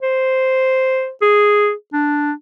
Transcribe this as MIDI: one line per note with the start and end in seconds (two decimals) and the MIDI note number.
0.03 1.10 72
1.22 1.72 68
1.93 2.32 62